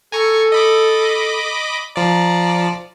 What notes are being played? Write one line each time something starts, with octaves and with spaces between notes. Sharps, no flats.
A4 G#5 A#5 C#6
D#5 B5 D6
F3 D5 A#5